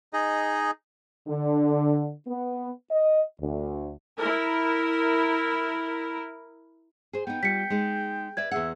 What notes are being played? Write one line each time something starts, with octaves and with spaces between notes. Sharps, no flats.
D#4 G#4 D#5
D3
B3
D#5
D2
E4 A#4
G#4 C5
B3 D#4 G5
G3 F4 B6 C#7
G#3 D#4
B4 D5 E5 G#6
E2 G#4 E5 F#5